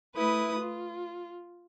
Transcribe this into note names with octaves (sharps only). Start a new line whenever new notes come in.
A3 E4 B4 D#6
F4